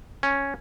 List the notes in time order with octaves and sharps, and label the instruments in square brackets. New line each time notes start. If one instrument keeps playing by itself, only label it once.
[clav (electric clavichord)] C#4